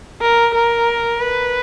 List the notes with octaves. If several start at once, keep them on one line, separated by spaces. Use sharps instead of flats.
A#4
A#4
B4